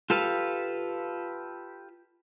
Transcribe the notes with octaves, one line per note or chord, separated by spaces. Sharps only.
F4 G4 A4 B4 F5